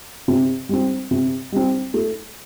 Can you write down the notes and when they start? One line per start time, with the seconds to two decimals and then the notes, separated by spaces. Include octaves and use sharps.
0.28 C3
0.69 G3 C4
1.11 C3
1.52 G3 C4
1.94 A3